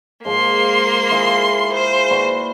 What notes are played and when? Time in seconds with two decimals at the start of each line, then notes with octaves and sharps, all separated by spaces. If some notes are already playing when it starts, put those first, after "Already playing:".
0.25 G#2 F3 A#3 C6
1.11 E4 F4 G#4
1.74 C5
2.11 A#2 F#4 B4